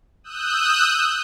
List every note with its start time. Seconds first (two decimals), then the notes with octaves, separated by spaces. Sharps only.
0.24 D#6 E6 F#6 G6